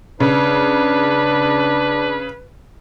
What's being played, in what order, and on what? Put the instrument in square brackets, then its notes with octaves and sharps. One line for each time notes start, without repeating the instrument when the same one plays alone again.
[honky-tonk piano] C#3 [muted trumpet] D4 [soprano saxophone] B4